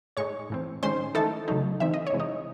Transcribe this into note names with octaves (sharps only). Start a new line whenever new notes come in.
A2 G#3 D#4 C#5 C#6
A2 E3 C4
D#3 G#3 C#4 C5 C6
E3 A3 D#4 A4 A5
C#3 F#3 A3 D#4
E3 C4 D#4 E5
D#5
C#5
C3 E3 G#3
D#4 D#5